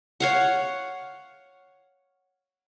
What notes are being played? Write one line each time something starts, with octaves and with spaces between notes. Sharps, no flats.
C#5 F5 F#5